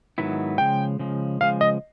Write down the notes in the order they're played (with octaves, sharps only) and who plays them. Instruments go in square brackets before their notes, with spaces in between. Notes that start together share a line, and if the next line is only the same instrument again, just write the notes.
[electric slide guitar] G#2 D#3 F#3 B3 E4
[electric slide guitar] C#3 F3 G#3 [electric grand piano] G5
[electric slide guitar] C#3 F3 G#3
[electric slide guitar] C#3 F3 G#3 [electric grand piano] F5
[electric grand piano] D#5